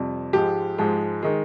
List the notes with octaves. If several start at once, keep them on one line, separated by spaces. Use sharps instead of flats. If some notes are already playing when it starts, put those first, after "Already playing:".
Already playing: F2 C3 G3
G#2 F3 G#3 G4
G#2 F3 G#3
D#3 G#3